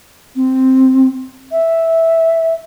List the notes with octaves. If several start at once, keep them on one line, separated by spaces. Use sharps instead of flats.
C4
E5